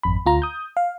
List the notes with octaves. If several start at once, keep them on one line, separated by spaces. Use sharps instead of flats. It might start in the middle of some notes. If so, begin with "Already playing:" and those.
G#1 F2 B5
D2 F4 A#5
D#6 G6
F5